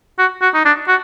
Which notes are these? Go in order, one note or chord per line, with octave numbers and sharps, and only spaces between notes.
F#4
F#4
D#4
D4
F#4